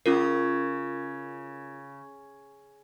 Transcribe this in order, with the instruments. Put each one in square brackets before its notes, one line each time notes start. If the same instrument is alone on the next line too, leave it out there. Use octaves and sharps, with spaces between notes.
[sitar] C#3 [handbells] C#4 F4 A#4